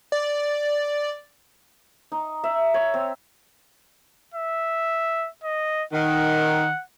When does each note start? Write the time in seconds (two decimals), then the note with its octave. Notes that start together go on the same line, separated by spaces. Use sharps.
0.12 D5
2.12 D#4
2.44 E5
2.74 C#5
2.94 C4
4.34 E5
5.43 D#5
5.93 D#3 F#5